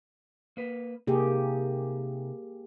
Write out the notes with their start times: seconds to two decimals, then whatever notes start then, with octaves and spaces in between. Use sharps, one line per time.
0.57 A#3 B4
1.07 C3 A#3 D#4 G4 G#4